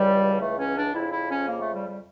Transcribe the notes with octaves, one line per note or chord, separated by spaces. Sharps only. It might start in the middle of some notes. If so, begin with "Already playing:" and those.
Already playing: C#2 C#3 E3 G3
A3
C#4
D4
F2 C#3 F3 E4
E4
C#4
A#3
A3
G3
G3